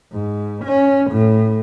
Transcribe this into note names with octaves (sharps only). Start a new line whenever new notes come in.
G#2
C#4
A2